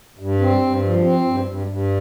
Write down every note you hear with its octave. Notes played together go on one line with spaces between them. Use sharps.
G2
C4
G2
F3
C4
G2
G2
G2